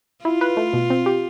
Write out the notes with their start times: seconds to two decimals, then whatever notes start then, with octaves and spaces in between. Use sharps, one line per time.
0.25 E4 F4
0.41 B4
0.57 A3
0.73 B2
0.90 C4
1.06 G4